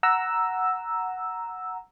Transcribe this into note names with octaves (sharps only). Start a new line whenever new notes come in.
F#5 A#5 E6